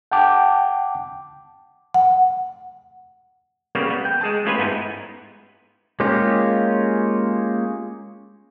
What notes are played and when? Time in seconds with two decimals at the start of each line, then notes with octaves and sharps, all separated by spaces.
0.12 F#5 G5 A5 D6
1.94 F#5
3.75 C#3 G3 A#3 B3
3.90 B3
4.05 G5
4.21 G#3 G#4 A5
4.45 A3 C#4 F4 G4 B4 G#5
4.58 G#2 B3 D#4 E4
6.00 G#3 A#3 C#4 F4 G4